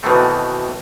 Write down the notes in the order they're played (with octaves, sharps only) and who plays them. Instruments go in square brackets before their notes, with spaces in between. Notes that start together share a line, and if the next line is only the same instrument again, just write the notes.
[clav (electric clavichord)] B2 D#3 E3 F#3 A3 C4